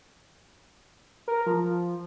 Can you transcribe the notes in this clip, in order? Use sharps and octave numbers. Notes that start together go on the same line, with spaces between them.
A#4
F3